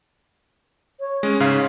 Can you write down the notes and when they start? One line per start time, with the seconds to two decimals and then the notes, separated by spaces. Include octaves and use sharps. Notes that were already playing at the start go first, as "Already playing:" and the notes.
1.00 C#5
1.23 G#3 C#4
1.40 G#2 C#3 F5